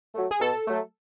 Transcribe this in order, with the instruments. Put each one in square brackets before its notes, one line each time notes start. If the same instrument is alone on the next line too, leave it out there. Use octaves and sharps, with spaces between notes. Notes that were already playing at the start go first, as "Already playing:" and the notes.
[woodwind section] F#3 A3
[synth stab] G#4
[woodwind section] B2 [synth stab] A4
[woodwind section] F#3 A3